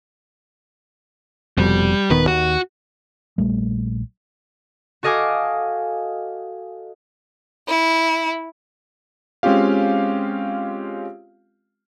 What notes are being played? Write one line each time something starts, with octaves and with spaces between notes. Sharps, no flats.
F1 F2 B2 G3
D#1 D#3 B3 B4
D#2 F#4
A#1 G3 A3
F#4 A4 D#5 F5 G#5 D6
E4
G#3 C4 C#4 F4 G4 F5